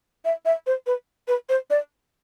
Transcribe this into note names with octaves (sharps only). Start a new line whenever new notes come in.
E5
E5
C5
B4
B4
C5
D5